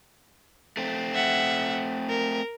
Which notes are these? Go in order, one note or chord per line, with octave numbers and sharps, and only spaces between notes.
A3 C4
E5 F#5
A#4